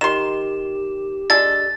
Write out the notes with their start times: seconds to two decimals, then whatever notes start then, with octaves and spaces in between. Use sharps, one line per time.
0.01 D#3 G4 C6 E7
1.30 G#3 D4 A4 A6